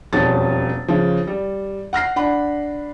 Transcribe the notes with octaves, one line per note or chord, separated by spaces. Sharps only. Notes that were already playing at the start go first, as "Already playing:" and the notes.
E1 F2 G3 C#4 A6
C#3 F3
G3
F#5 F6 A#6 C7
D4 F#5 B5